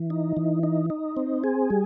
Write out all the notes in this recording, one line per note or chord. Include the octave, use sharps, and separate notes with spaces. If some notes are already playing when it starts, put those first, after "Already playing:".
Already playing: E3
D#4
E3
D#4
D#4
C4
G#4
G3